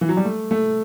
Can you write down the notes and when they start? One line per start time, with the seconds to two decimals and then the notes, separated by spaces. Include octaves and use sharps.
0.01 E3
0.09 F#3
0.17 G3
0.25 A3
0.51 A3